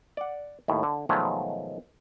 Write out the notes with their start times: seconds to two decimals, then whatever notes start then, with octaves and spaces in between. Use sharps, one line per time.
0.17 D5 F#5
0.68 D#2 A2
0.83 D3
1.09 B2 D#3 F3 F#3 G#3 A3